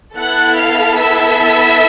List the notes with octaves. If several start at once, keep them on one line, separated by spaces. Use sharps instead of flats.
B3 E4 A4 F#5 F#6
F5 F6
E5 E6